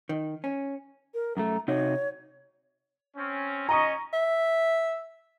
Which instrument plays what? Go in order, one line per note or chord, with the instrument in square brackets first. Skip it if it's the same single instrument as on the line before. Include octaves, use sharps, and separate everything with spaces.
[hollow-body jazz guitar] D#3
C#4
[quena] A#4
[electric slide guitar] F#2 A3 [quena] A#5
[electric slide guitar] C3 D#4 F#4 [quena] C#5
[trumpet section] C4 C#4
[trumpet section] C#4 D#5 [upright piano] A#5 C#6
[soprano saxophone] E5